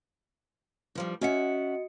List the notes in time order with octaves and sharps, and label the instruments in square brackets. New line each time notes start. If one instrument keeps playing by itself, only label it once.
[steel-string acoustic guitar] G2 F3 G3
[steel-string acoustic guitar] C#4 E5 F#5 [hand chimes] F#4 D#5 C#7